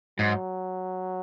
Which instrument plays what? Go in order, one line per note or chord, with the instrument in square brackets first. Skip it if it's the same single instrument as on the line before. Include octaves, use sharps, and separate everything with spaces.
[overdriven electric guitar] G#2 [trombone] F#3